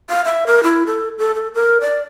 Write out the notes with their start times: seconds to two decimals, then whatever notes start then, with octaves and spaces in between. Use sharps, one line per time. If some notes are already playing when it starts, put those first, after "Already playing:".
0.10 F5
0.25 E5
0.47 A#4
0.63 E4
0.87 A4
1.18 A4
1.35 A4
1.54 A#4
1.81 D5